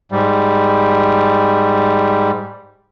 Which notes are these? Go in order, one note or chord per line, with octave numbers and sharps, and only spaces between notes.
G#2 G3